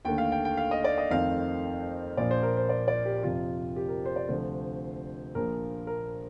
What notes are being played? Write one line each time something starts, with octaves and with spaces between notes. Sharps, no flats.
D#2 D3 A3 G5
F5
G5
G5
F5
D#5
D5
D#5
F2 D#3 A3 C4 F5
A#1 A#2 F3 D5
C5
A#4
C5
D5
D5
G4
F2 C3 F3 F4
G4
A#4
C5
D5
D2 C3 F3 A3 C5
A#1 A#2 F3 A#4
A#4